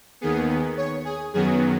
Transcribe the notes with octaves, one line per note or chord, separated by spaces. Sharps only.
D#2 D#3 B3 G#4
C#5
G#4
F#2 D#3 F#3 B3 G#4